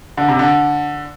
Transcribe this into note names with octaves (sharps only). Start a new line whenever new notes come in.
D3
C3
D3